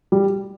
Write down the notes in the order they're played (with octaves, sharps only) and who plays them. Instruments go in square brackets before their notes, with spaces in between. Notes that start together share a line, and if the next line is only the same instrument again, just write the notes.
[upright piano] G3